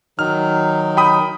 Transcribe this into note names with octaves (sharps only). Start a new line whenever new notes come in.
D#3 F#3 D#4 F6
G5 B5 D#6